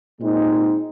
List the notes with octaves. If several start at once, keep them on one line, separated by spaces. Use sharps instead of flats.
A#2 G#3 C4 D#4